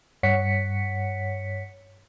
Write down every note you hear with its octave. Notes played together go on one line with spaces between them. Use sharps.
G2 C#5 F#5 B6 C#7